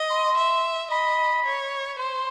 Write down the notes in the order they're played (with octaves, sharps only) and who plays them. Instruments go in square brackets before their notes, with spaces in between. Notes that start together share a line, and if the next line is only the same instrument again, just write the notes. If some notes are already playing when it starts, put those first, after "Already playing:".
Already playing: [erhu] D#5
[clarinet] C6
[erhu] E5
[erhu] D#5 [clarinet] B5
[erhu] C#5
[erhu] C5 [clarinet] C6